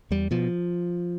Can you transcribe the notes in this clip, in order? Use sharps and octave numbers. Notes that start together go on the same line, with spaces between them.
E2 G3
B2 F3